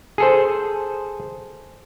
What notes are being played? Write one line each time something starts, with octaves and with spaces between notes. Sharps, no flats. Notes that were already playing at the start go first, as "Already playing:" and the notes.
G#4 A4 C5